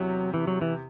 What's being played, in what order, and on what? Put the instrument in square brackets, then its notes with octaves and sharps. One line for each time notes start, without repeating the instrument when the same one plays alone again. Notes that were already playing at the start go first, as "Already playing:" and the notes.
Already playing: [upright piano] E2 C3 [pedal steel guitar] F#3
[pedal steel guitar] E3
F#3
E3